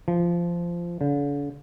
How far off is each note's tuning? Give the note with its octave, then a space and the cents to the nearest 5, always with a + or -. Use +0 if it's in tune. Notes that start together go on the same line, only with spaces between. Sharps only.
F3 -15
D3 -45